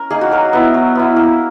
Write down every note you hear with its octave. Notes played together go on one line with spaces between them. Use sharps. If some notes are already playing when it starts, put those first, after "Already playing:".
Already playing: C#4 A#4
A#3 D#4 G#4
F#4
F#3 A#4
B3 E4
F#3
B3 E4
A#3